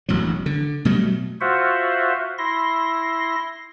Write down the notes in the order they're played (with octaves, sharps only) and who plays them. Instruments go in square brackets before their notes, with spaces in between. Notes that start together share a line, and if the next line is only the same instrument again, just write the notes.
[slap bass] E1 A1 D2 F#3
D3
B2 F#3 G3 A3
[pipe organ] F4 F#4 C5 E5 F#5
E4 C6 A#6